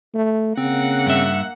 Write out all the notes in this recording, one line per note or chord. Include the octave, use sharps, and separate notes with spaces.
A3
C#3 A#3 C4 F#5
G2 E5